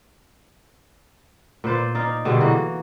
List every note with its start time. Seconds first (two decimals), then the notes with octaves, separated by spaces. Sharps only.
1.64 A#2 B4 C5 D5
1.95 D#4 D5 F5
2.25 B2 D3 G3 G#3
2.41 E3 A#3 F#4